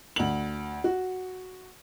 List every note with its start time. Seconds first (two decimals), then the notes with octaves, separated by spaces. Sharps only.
0.16 D2 F#7
0.84 F#4